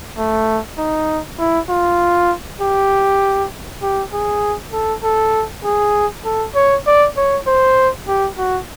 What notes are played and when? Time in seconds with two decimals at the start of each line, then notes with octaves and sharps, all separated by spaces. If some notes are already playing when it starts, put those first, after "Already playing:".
0.18 A3
0.78 D#4
1.38 E4
1.69 F4
2.61 G4
3.82 G4
4.13 G#4
4.73 A4
5.03 A4
5.64 G#4
6.25 A4
6.55 C#5
6.87 D5
7.17 C#5
7.47 C5
8.08 G4
8.38 F#4